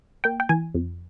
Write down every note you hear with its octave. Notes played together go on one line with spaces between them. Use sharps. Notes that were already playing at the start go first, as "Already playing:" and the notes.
A#3 G5
G5
E3 G#5
F2